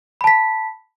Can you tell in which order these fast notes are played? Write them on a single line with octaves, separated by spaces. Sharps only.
B5 A5 B6